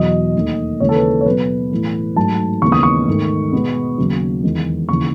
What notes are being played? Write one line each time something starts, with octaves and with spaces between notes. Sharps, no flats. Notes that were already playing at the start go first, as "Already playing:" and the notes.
Already playing: E2 B2 F#3 D#5
D#2 D#3 A3
D#2 C#3 E3 G#3 C#5
A4
B4
C#5
B2 F#3 B3 B4
A2 E3 A3
G#2 F#3 A3 A5
D#2 C#3 E3 G#3 B3 C#6
D#6
C#6
G#2 D#3 A3
B2 G#3 B3
D#2 C#3 F#3
E2 D#3 G#3 B3
D#2 C#3 E3 C#6